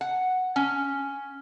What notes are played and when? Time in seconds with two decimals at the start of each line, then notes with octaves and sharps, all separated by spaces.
0.01 F#5
0.56 C#4